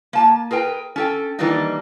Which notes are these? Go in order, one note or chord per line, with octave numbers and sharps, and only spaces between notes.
A#3 A5
G#4 A#4 B4 G5
C#4 A4 G5
D#3 E3 G3 A#3 D4 D#4